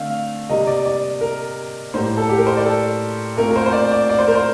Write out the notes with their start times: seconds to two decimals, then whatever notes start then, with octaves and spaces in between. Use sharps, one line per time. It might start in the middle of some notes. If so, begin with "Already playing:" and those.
Already playing: D3 A3 C4 F5
0.49 C3 G3 A#3 D#5
0.67 D5
0.85 D5
1.21 A#4
1.94 A2 G3 A#3 C5
2.17 A4
2.29 G4
2.38 A#4
2.47 C5
2.57 D5
2.65 A4
3.37 A#2 A3 C4 A#4
3.51 A#4
3.56 C5
3.66 C5
3.73 D5
3.91 D5
4.09 D5
4.19 C5
4.28 A#4
4.35 C5